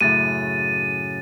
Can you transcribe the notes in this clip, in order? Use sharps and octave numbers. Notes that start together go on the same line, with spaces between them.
F#2 A2 C#3 A6 D#7